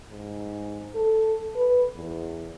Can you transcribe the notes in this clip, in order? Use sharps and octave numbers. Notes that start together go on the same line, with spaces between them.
G#2
A4
B4
E2